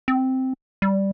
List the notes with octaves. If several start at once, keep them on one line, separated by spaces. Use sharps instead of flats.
C4
G3